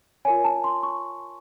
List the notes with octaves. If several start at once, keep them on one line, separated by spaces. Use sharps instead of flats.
F4 A#4 C#5 G#5
A5
C6
C#6